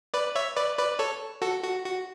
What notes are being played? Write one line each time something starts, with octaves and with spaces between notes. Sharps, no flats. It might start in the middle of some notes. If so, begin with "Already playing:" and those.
B4 D5
C#5 E5
B4 D5
B4 D5
A4 C#5
F#4 A4
F#4
F#4